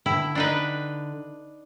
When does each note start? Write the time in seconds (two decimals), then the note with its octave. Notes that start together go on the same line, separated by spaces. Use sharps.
0.06 D3 E4 G5
0.35 D4 D#4 B4